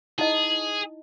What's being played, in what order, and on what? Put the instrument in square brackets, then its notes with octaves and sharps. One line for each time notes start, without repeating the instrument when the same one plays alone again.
[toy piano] D#4 E4 D#5 [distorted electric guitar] G#4